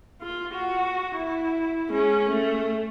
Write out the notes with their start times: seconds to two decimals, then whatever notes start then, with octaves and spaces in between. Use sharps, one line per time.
0.22 F4
0.53 F#4
1.15 E4
1.90 G#3 C#4
2.29 A3